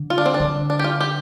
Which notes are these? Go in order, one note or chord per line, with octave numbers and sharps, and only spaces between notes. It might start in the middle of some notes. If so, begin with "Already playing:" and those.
Already playing: D3
F4
D4
C4
D4
D3
D4
G4
F4
G4